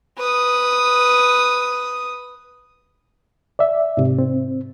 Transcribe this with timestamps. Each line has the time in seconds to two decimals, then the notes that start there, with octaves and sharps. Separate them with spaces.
0.18 B4 D#6
3.59 D5 E5
3.97 G#2 C3
4.18 C4